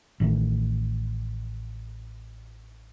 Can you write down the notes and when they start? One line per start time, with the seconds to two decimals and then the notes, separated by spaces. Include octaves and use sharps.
0.20 A1 D#3 G3 A3